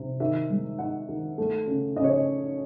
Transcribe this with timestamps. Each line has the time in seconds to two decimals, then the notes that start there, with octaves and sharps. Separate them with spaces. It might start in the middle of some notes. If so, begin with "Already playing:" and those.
Already playing: C3
0.20 D#3 E5
0.50 G#3
0.79 D#4 F#5
1.09 D#3
1.38 A3
1.67 C#3
1.96 C#3 D#5
2.04 C#5
2.11 D#5